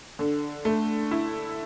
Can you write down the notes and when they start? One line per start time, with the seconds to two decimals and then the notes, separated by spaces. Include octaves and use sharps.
0.19 D3
0.65 A3
1.11 E4